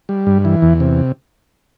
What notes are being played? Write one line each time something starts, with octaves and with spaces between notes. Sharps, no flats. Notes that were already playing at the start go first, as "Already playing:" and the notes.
G3
G2
E3
E2
C3